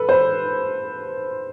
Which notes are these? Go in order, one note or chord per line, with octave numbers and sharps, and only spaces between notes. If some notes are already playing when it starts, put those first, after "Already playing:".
Already playing: A4 B4
C5